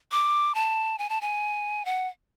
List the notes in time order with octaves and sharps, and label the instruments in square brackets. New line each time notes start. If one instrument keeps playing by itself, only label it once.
[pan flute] D6
A5
G#5
A5
G#5
F#5